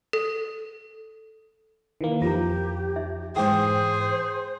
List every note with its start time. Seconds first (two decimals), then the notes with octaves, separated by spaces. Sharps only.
0.13 A4
2.01 D#3 E3 A#3
2.22 F2 F3 F4 G4 A#5
2.96 D#4 E5
3.36 G#2 E3 G#4 C5 G5 D6